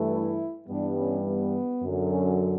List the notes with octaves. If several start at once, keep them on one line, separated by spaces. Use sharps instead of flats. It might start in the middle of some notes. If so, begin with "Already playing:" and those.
Already playing: G2 E3 A3
E4
G2 E3 G3 B3 D4
C#4
B3
F#2 D3 F#3
C#4